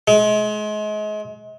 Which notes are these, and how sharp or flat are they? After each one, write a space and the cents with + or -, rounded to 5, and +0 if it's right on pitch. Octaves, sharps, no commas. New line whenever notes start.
G#3 +35